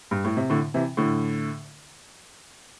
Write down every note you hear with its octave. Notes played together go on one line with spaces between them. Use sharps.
G2
A2
C3
A2 D3
C3 E3
A2 D3